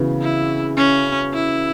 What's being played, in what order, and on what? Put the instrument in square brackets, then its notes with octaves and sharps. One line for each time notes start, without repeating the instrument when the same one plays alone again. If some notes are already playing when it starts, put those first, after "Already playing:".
Already playing: [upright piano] C#3 E3 B3 F#4
[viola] E4
C#4
E4